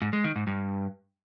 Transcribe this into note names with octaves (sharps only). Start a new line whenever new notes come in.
G#2
G#3
D#3
G#2
G2